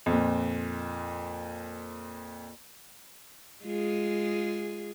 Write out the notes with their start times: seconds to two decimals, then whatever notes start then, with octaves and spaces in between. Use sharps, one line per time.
0.06 F2 A#2
3.65 G#3 F4 G#4